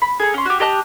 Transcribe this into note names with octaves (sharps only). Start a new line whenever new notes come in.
B5
G#4 A4 A#5
C#4 C6
F#4 G4
G4 D#5 A5 F#6